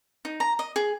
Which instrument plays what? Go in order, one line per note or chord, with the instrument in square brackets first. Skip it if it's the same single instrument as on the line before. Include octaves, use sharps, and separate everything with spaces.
[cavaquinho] D#4
A#5
D#5
G#4